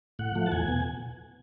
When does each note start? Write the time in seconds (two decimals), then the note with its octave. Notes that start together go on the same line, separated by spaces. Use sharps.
0.19 A2 F#5
0.35 F3 A3
0.46 A5
0.52 E2 G#5
0.68 B2